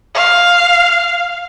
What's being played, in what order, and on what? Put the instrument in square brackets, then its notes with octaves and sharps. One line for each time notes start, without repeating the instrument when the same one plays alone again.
[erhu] F5